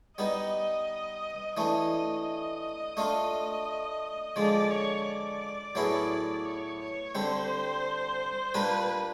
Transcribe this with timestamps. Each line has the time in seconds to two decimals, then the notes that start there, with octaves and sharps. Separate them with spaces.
0.18 G3 B3 D#4 D#5
1.57 E3 A3 D4 D#5
2.97 A3 D4 F4
4.36 D3 F3 G#3 D5
4.71 C#5
5.05 D5
5.75 A2 F#3 B3 E4 G#4
6.45 C#5
6.80 C#5
7.15 D3 G3 C4 C5
8.54 A#2 G3 A#3 D4 G4 B4